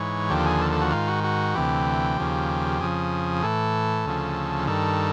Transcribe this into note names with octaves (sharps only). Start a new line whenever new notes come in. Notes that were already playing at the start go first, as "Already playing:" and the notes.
Already playing: G#2 E3 C#5
D#2 D3 F3 G4
G#4
A4
A4
F#4
G#2 D#3 F4
F#4
F#4
D2 C3 E3 G4
D#2 C#3 F3
F2 C#3 F3 G#4
A2 E3 A4
D2 C#3 F3
G2 D#3 A4